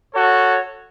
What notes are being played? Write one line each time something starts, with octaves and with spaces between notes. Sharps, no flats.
F#4 A4 C#5